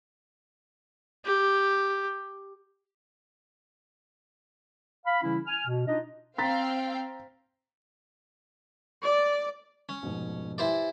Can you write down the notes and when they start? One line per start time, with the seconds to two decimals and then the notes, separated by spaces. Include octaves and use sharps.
1.25 G4
5.06 F5 B5
5.23 C#3 E3 G3 C#4 E4
5.47 G#5 F6
5.67 B2
5.87 D4 D#4 F4 D#5
6.38 C4 F5 G5 A#5 A6 B6
9.03 D5
9.89 C#4
10.03 F1 G#2 B2
10.58 E4 G4 B4 C5 D5 G#5